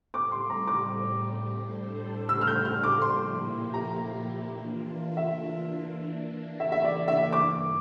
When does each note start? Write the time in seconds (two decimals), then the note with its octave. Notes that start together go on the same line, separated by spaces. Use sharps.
0.14 A2 G3 C4 D6
0.32 C6
0.50 A#5
0.68 D6
1.58 A2 G3 D4 A4 C5
2.29 E6
2.41 F6
2.47 G6
2.65 F6
2.83 D6
3.01 A#2 F3 A#3 E4 G4 C6
3.74 A#5
4.45 E3 A#3 D4 F4
5.17 E5
5.88 E3 A#3 D4
6.60 E5
6.72 E5
6.84 D5
7.08 E5
7.32 G2 E3 A#3 D6